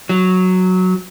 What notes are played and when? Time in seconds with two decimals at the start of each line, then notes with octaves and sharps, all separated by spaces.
0.09 F#3